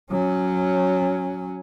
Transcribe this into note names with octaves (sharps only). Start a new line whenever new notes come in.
F#3 C#4